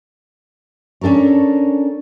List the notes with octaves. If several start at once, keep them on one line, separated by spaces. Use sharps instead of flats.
C#4 D4 A4 A#4 C#5